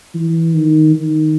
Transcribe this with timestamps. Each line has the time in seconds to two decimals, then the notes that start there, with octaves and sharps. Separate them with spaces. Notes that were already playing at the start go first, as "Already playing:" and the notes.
0.14 E3
0.54 D#3
0.95 D#3